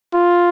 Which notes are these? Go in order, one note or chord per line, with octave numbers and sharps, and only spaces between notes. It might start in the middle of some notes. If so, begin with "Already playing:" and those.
F4